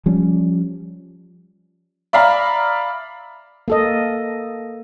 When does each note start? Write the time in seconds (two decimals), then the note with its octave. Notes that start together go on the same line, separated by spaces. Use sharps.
0.06 F3 G3 C#4
2.13 D5 E5 F5 A#5 B5
3.68 A#3 A4 D#5